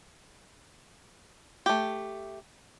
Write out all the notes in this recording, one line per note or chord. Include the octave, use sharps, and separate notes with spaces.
A3 G4